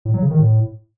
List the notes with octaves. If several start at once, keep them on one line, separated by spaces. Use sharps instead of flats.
A2
F#3
C#3
D#3
A2